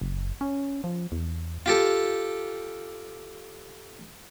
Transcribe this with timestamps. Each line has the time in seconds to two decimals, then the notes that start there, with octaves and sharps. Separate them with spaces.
0.01 F#1
0.41 C#4
0.84 F3
1.12 E2
1.66 F4 G4 A4